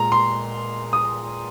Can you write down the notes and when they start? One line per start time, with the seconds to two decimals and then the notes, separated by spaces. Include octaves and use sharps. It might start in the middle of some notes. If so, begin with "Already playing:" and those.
Already playing: A#2 G#3 A#5
0.12 C6
0.93 D#6